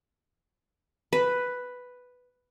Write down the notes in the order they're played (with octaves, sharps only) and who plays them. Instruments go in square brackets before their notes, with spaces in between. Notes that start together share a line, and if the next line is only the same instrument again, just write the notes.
[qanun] B4